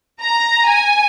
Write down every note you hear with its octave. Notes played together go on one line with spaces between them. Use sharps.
A#5
G#5